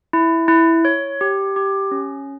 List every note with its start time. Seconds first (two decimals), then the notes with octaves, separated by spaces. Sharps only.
0.13 E4
0.48 E4
0.85 C#5
1.21 G4
1.56 G4
1.91 C#4